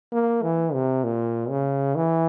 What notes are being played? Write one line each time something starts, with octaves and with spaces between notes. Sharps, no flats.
A#3
E3
C3
A#2
C#3
E3